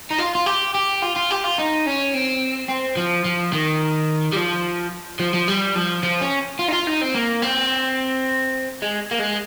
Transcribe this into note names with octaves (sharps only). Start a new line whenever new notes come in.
D#4
F4
F4
G4
G4
F4
F4
G4
F4
D#4
C#4
C4
C4
F3
F3
D#3
G3
F3
F3
F3
G3
F3
F3
C#4
F4
D#4
F4
D#4
C4
A#3
C4
G#3
A#3
G#3